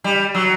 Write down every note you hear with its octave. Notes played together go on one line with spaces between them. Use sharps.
G3
F#3